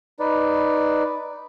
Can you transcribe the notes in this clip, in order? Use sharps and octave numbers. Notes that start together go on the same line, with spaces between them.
D#4 B4 D5